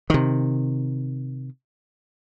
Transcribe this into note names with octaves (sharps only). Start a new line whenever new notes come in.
C3 D#3